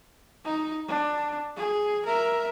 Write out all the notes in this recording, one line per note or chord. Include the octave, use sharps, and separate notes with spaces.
D#4
D4
G#4
A#4 E5